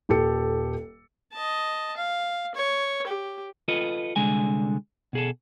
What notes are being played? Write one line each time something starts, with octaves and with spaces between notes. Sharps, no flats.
D#1 G4 A4 C#7
D#5 A5
F5
C#5
G4
F4 A4 B4 D#5
C2 D3 G#3 G#5
B2 G#4 A4